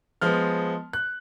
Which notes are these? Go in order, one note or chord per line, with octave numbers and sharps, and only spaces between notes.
F3 G#3 B3 F6
F#6